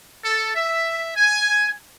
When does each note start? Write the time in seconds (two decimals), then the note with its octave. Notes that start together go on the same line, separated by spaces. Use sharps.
0.24 A4
0.55 E5
1.17 G#5